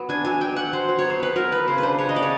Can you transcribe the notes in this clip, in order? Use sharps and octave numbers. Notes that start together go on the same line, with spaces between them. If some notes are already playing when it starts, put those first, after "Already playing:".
Already playing: F#3 B3
D4 G#5
F#3 G#5
F#3 G5
F#3 F#5
F#3 C5
F#3
C#5
B3
C5
B3 B4
F#3 A#4
B3 B4
C#3 C5
B4
D4 C5
C#3 C#5
D#5
B3 D5
C#5